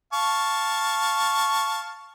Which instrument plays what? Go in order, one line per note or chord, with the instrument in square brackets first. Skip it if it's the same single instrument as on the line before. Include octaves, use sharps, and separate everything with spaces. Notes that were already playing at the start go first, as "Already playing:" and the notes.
[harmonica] F5 A5 C#6